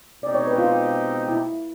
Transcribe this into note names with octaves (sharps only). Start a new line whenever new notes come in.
B2 G#3 C4 D#4 G4 D5
C#5
B4
F4
E4